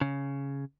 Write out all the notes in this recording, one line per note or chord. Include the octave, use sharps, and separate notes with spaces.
C#3